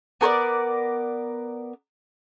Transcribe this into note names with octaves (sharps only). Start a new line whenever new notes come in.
B3 A#4 C5 D5